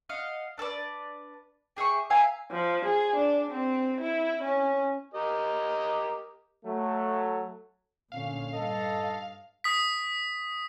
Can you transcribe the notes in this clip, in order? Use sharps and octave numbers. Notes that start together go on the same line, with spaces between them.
D#5 F5 F#5
D4 A4 B4 D5
G4 G#4 E5 C#6
E5 F5 G#5 A#5
F3
G#4
D4
C4
E4
C#4
G4 A#4 D#5
F#3 A3
A#2 D3 C#4 F5
G2 A4 D#5
D#6 B6